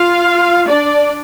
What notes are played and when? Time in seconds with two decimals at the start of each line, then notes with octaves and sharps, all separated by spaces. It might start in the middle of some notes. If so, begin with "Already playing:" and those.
Already playing: F4 F5
0.68 D4 D5